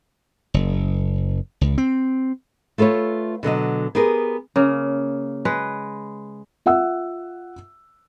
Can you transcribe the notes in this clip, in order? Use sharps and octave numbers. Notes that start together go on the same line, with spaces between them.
F#1
C#2
C4
A3 F4 A4 B4 C#5
B2 D3 F#3 D#5
B3 G4 G#4 A#4
C#3 A#3
G#3 B4
F4 E5 F#5 E6